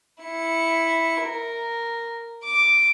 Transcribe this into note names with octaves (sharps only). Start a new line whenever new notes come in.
E4 C#7
A#4
D6